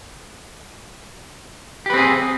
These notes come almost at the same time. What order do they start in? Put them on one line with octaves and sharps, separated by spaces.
G4 B4 C4 G#4